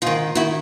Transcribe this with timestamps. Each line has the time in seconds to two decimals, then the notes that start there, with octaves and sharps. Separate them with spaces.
0.02 G#2 D#3 D#4 F4
0.35 D#3 E4 F#4